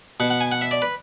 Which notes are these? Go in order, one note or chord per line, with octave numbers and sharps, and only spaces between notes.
B2 F#5
F#5
G#5
F#5
E5
D5
B4